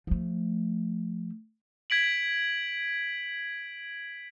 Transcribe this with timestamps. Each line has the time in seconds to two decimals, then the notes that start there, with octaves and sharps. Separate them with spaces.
0.07 F3 A3
1.90 G#6 B6 D7 F#7